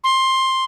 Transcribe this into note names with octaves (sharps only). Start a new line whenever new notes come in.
C6